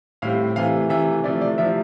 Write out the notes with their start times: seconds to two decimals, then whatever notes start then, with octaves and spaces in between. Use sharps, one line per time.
0.22 A2 G3 C4 F5
0.56 C3 E3 A3 F5
0.89 C3 E3 A3 E5
1.24 C3 F3 A3 E4 D5
1.41 D5
1.58 C3 F3 A3 E4 E5